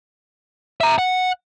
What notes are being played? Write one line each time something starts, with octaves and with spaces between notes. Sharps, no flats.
E5 A#5
F#5